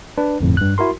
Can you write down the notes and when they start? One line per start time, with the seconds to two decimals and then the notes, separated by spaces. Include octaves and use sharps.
0.18 D4 B4
0.41 G1 F2 A2
0.57 G2 F#6
0.78 E4 F#4 A#4 C6